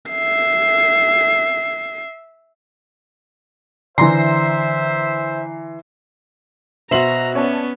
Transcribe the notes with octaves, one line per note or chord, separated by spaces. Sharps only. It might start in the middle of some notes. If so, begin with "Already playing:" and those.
E5 C7
D3 E3 C5 E5 A#5 C6 C7
B2 F#4 C5 E5 A#5 F#7
B3 C#4 C#5 D5 A5